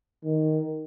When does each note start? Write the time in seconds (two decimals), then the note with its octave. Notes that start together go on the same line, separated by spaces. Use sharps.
0.24 D#3